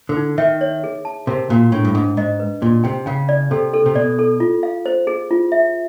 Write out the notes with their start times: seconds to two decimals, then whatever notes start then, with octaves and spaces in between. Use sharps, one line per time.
0.09 D3
0.17 D#4
0.38 D#3 E5
0.61 C#5
0.84 G#4
1.05 A5
1.27 C3 A#4
1.50 A#2 F#4
1.72 A2 D4
1.85 G2
1.94 G#2 D4
2.17 G#2 D#5
2.40 B4
2.62 A#2 F#4
2.84 C3 G5
3.06 C#3 G5
3.29 D5
3.51 C3 A4
3.74 A4
3.86 C3
3.95 B2 D5
4.19 A4
4.40 F4
4.63 F5
4.86 C5
5.07 G#4
5.31 F4
5.52 E5